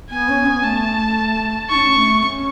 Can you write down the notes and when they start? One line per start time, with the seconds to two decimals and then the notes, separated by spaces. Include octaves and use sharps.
0.11 B3 G#5
0.29 C#4
0.46 B3
0.64 A3 A5
1.70 D#4 C#6
1.75 C#4
1.96 A3
2.23 C#4